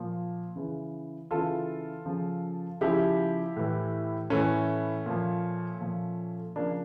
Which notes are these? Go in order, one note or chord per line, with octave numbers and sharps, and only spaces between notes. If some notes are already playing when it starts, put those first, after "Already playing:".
Already playing: A#2 F3
C#3 E3
C#3 E3 F4 A4
C#3 F3
C#3 F3 E4 G4
A2 E3
A2 E3 A3 C#4
A#2 F3
A#2 F3
C#3 F3 A#3 D4